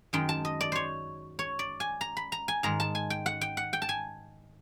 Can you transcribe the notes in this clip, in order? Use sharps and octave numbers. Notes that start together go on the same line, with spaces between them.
F#2 D#3 G#3 G5
A5
D#5
D5
C5 C#5
C#5
D5
G#5
A#5
B5
A#5
G#5
G#2 D#3 G#3 A#5
A5
G#5
G5
F#5
G5
F#5
G5
A5
G#5